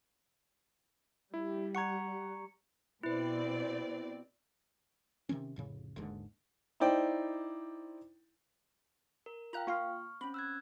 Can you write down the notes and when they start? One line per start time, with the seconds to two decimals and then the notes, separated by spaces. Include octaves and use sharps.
1.34 G3 E4
1.75 F#5 A#5 C#6 G#6 C#7
3.03 B2 C4 E4 B4 D5
5.29 C3 D#3 C4 C#4
5.56 F1 A2 C#3
5.96 G#1 D#2 G#2 D3
6.80 D#4 E4 C5 D5 G5
9.26 A#4
9.53 F4 F5 G5 A#5 F#6
9.67 A#3 F4 F5 C#6 F6
10.21 C4 C#4 B5
10.34 E6 F#6 G#6